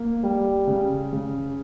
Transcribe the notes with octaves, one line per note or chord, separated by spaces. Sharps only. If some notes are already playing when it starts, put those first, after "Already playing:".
Already playing: A#3
G3
C#3
C#3